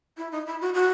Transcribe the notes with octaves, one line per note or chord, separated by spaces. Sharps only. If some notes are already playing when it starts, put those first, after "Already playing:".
E4
D#4
E4
F#4
F#4